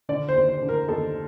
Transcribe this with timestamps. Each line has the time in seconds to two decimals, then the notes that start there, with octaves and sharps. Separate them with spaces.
0.09 D3 D5
0.29 C5
0.36 D#2
0.49 C5
0.62 D3
0.69 A#4
0.89 D#2 A4